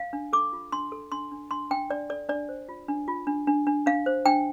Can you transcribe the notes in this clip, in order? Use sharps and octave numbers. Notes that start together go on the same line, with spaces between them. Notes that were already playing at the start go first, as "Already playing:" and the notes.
Already playing: F5
D4
A4 D6
F4
D4 C6
A4
D4 C6
D4
D4 C6
D4 G5
D4 D5
A4 D5
D4 D5
C5
F4
D4
F4
D4
D4
D4
D4 F5
C5
D4 G5